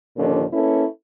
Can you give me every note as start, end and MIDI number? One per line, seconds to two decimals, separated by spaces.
0.16 0.44 39
0.16 0.44 46
0.16 0.44 50
0.16 0.44 53
0.16 0.44 61
0.53 0.84 58
0.53 0.84 61
0.53 0.84 64
0.53 0.84 69
0.53 0.84 71